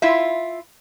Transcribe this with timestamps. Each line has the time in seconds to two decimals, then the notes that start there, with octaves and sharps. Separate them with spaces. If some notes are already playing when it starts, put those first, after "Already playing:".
0.02 E4 F4 E5